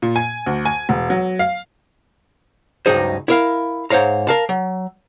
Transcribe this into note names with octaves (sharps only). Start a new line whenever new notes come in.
A#2
G#5
D2
G#5
E1
F#3
F5
C#2 G2 F#3 D#4 G#4 C5
E4 A#4 F5
G#2 C5 C#5 F5 A#5
A#4 F5 A5
F#3